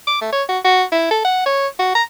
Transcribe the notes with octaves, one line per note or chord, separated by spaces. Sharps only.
D6
A3
C#5
F#4
F#4
E4
A4
F#5
C#5
F#4
A#5